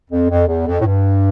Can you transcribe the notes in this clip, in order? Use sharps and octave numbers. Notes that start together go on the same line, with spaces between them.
F2
F2
E2
F2
A2
G2